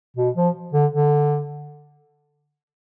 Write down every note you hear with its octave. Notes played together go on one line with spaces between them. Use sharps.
B2
F3
D3
D3